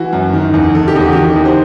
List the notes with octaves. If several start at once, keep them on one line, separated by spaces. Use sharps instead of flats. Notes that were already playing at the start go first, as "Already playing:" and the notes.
Already playing: E3 F#4
F#2
D#3
E2
D#3 A4
G4
E2 F#4
D#3 G4
E2
C5